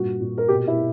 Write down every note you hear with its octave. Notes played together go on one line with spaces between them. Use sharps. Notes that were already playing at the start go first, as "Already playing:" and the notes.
Already playing: G2 A#2 F#4
A#2
A#4
B2 G4
E4
B2